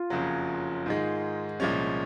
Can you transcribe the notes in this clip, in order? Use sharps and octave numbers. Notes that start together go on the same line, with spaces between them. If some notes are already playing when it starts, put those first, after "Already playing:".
Already playing: F4
F#1 F2 C#3 F#3
G#2 D#3 G#3
C2 A#2 F3 G#3 C#4